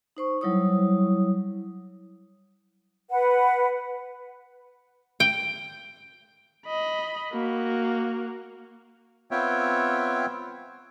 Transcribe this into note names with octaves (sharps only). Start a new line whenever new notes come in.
D#4 C5 C#6
F#3 G3 E4 C#5 D#6
B4 F#5
G5
D#5 B5
A#3 F#4
B3 C4 F4 C#5 E5 G5